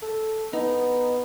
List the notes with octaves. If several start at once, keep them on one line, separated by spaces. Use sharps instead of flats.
A4
B3 D#4